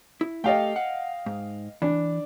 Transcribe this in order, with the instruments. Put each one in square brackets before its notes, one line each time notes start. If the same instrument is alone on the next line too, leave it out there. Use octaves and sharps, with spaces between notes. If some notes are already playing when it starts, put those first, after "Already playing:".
[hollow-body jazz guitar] E4
[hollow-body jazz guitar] A3 G4 A4 [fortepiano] D#5 F5 G5
[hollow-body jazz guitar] F#5
G#2
[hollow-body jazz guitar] E3 [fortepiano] D4